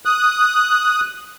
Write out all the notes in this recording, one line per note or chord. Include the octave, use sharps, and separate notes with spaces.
D#6 F#6